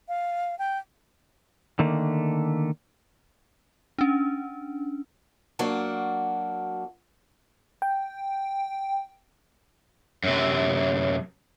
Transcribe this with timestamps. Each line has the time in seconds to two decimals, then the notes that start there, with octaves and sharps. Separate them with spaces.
0.08 F5
0.59 G5
1.79 D3 D#3 A3 A#3
3.98 C#4 D4
5.59 F#3 A#3 D4 F#4
7.82 G5
10.24 F#2 C3